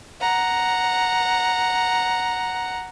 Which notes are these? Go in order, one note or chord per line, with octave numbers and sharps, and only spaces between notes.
F#5 A#5